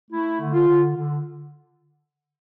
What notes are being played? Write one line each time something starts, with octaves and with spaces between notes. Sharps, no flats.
A3 E4
D3
F4
D3
D3